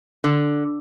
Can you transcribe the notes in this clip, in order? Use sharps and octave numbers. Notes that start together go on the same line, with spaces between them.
D3